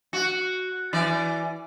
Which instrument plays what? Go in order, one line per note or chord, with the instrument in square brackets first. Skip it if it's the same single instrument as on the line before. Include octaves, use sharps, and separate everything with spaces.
[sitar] F#4
E3 D5